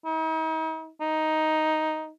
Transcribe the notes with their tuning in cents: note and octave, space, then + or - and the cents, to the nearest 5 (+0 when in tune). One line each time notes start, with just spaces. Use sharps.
D#4 +45
D#4 +5